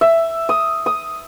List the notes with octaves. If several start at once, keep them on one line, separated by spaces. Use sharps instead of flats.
E5
D#6
D#6